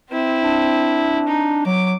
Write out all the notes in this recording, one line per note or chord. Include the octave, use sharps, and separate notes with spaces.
C4 E4
D4
D#4
F#3 D6